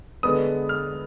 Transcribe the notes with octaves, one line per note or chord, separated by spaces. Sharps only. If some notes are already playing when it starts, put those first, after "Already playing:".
D3 G#3 B3 D#6
F6